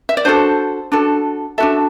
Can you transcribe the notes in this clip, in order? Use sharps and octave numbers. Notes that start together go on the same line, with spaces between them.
E5
D5
D4 F#4 A4 C5
D4 F#4 A4
D4 F#4 A4 E5